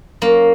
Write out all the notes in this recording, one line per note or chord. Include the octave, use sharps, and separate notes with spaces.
F#2 A#3